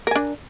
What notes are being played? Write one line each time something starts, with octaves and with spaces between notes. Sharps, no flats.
D4 A#4 G#5